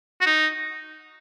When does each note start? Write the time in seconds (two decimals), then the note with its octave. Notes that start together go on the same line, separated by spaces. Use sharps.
0.21 F#4
0.26 D#4